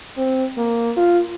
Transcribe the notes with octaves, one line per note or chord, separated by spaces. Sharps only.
C4
A#3
F4